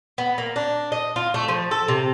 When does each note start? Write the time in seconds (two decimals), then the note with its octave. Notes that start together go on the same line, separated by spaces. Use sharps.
0.18 B3
0.38 A#3
0.56 D4
0.92 D#5
1.16 F4
1.34 A3
1.48 F3
1.71 A4
1.88 C3